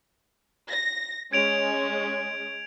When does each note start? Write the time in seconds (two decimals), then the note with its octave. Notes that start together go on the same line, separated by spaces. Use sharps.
0.69 A#6
1.33 G#3 C#4 G#6 D7 F7